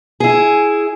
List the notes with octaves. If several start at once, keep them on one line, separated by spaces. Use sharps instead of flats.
E4 G#4